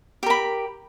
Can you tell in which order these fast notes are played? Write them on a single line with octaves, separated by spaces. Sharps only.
G4 A#4 B5